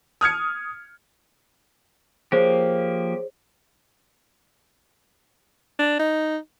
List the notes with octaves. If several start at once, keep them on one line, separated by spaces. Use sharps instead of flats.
D#6 F6 G#6 C#7
F3 A#3 G4 G#4 C5 C#5
D4
D#4